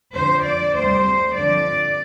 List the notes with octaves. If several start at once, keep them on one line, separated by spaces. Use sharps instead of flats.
F2 D3 F3 C5
D5
D2 C3 G3 C5
F2 D3 F3 D5